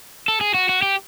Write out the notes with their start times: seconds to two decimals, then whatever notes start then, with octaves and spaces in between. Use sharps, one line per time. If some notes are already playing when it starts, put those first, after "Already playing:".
0.28 A4
0.41 G#4
0.54 F#4
0.69 F#4
0.82 G4